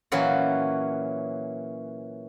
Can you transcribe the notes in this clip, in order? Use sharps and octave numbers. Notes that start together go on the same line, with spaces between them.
A#2 E3 F#3 C#4 F#4